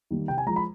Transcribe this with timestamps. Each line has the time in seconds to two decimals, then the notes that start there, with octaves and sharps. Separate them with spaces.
0.11 D#3 G3 A#3
0.28 C3 G5
0.38 G#5
0.46 F3 G#3 A#5
0.56 B5